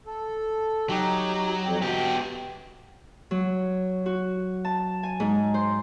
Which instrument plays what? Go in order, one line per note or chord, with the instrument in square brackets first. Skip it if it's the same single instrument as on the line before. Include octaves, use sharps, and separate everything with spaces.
[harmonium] A4
[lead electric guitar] F#3 [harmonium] D#4 G4
[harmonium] F2 G4
[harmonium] F#3 G5 [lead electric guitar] B3 G4
[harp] F#3
F#4
A5
G#5
G#2
C5